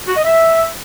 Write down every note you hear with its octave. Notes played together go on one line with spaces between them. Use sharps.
F#4
D#5
E5